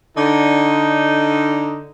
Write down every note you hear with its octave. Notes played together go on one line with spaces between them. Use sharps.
D3 D#4